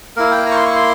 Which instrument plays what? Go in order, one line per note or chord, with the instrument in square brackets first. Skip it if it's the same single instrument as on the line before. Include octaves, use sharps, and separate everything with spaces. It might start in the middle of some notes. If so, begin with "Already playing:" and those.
[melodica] A#3 E4 A#4
G5
A#5
C#6
C6
C#6
C6